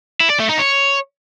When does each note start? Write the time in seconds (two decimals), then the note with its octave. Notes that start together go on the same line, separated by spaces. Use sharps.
0.20 E4
0.30 D5
0.40 A3
0.49 D#4
0.59 C#5